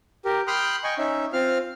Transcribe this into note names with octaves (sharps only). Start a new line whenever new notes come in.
G4 A#4
G5 B5 C6 D#6 F6 F#6
D#5 G5 G#5 C#6
C#4 D#4 E5
C4 F4 F5 F6